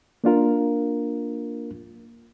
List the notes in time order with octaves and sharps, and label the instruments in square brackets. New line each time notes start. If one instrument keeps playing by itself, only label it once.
[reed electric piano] A#3 D4 F4 A#4